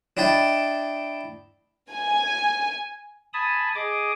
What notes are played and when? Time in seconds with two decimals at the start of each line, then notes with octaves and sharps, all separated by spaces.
0.17 D4 E4 D#5 G5 A5 B5
1.91 G#5
3.33 G#5 A5 B5 D#6
3.75 G#4 D#5 D6 D#6